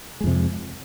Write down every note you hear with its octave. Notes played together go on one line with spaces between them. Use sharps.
F2 C3 G#3